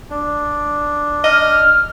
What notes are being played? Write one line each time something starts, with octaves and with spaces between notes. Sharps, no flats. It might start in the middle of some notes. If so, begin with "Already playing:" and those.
D4
D#5 F6